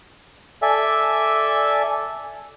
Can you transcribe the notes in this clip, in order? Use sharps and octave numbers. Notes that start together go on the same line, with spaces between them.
A4 D5 E5 G#5